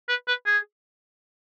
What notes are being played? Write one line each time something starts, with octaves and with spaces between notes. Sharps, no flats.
B4
B4
G#4